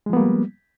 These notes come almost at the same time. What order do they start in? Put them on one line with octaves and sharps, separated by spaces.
G#3 F3 B3 A#3 G3